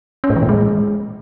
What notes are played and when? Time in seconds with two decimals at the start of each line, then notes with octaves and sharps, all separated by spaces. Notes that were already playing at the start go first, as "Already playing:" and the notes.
0.24 C#4
0.30 A2
0.36 E3
0.43 A#2
0.49 G#3